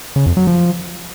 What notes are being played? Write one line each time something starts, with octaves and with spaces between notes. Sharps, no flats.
C#3
F2
F#3
F3